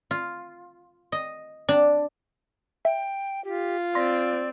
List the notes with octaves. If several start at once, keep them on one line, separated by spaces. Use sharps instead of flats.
F4
D#5
D4
E5 G5
F4 G4
C4 D5 C6 A#6 B6